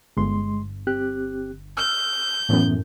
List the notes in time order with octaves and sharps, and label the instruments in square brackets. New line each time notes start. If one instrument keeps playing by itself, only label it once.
[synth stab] G1 [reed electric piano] G#3 C6
[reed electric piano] C4 G4 F#6
[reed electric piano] E6 F6 [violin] G6
[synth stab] F#2 A2 [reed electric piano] E3 B3